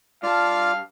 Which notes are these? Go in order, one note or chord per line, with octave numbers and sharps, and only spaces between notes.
G2 F4 D5 F5 A5 F6